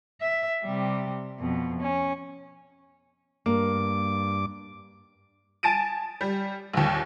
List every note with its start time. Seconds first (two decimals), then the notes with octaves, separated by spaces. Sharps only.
0.21 E5
0.63 C3 G3
1.39 F2 B2
1.81 C#4
3.46 G2 A#3 D6
5.63 G#5 A5 A6 D7 D#7
6.21 G3
6.74 A#1 D#2